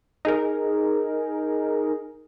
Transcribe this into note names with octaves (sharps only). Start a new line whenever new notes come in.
D#4 G#4 A#4